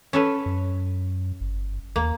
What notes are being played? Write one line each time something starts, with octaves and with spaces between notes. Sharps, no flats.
C#4 A4 B4
F#2
G1
D#2 A#3